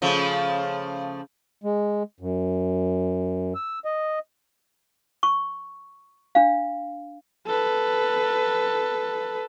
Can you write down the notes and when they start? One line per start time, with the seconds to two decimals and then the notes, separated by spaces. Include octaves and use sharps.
0.02 C#3 F3 A3
1.64 G#3
2.20 F#2
3.55 E6
3.85 D#5
5.23 C#6
6.35 D4 F5
7.47 A4 B4